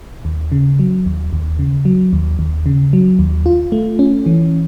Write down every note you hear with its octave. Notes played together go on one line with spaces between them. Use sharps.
D#2
C#3
F#3
D#2
D#2
C#3
F#3
D#2
D#2
C#3
F#3
D#2
F4
A3
C#4
E3